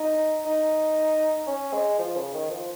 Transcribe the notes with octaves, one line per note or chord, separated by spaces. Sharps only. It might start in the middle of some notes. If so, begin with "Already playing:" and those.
Already playing: D#4
D#4
C#4
G#3
F3
C#3
D#3
F3